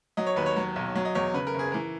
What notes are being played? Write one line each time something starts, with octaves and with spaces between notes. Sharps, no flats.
F#3 D#5
C#5
D#2 B4
C#5
F#3
B1
F#3
D#5
E2 C#5
C#3 B4
A#4
F#1 G#4
E3 A#4